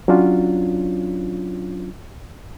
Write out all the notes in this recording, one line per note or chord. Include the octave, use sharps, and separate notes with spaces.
F#3 C#4 D4 F4